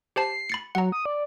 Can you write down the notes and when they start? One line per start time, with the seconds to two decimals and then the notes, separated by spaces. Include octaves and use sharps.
0.16 G4 C5 A5 C7
0.50 B5 A6 C#7
0.75 F#3 F#5 A#5
0.92 D#6
1.06 D5